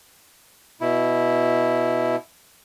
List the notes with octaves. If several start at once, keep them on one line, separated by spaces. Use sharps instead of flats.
B2 E4